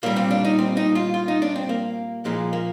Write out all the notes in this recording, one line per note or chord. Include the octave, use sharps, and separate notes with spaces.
A#2 G3 A#3
C4
D4
D#4
C4
D#4
F4
F4
D#4
D4
C4
A#3
A#2 F3 G#3
A#3